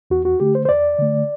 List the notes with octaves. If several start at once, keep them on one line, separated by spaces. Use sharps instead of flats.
E2 F#4
F#4
D3 A3 G4
C5
C5
E2 D5
D3 A3